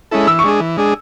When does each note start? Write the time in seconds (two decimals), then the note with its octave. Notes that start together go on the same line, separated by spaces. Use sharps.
0.11 G#3 C#4 E4 A4
0.27 E3 E6
0.39 C#6
0.44 G#3 D4 G#4
0.60 E3
0.77 G#3 D4 G#4